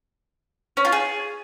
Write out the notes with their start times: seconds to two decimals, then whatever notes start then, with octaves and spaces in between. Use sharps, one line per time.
0.77 C#4
0.85 F4
0.92 G#4